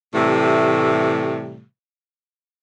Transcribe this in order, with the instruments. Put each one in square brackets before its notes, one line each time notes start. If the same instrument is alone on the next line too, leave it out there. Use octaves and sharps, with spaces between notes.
[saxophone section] A2 C3 E3 G3 A3